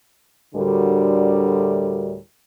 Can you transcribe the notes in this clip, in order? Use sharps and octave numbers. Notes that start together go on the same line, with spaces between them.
D2 A2 D3 G3 F#4 A#4